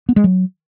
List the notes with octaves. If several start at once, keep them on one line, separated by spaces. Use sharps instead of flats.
B3
G#3
F#3